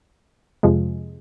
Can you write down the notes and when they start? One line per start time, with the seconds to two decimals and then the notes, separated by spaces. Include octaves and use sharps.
0.63 F2 C3 F3 G#3